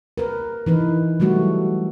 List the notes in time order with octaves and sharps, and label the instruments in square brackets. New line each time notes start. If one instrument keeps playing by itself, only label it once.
[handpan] A#4 B4
E3 D#4 B4
F#3 G3 A3 F#4